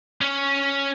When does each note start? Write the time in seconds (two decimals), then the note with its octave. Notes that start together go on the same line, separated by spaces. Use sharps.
0.21 C#4 C#5